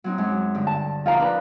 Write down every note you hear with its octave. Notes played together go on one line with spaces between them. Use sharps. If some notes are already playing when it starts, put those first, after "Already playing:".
F#3 C4 D#4
F#2 F#3 G#3
G2 D3
A5
F3 D#4 F4 F5 A#5
D4 A#4 B4